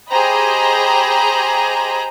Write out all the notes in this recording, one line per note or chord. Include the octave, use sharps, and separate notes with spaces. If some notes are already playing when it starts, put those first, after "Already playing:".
G4 G#4 C5 D#5 A#5 B5